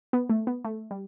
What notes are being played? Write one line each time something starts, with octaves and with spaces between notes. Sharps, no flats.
B3
A3
B3
A3
G3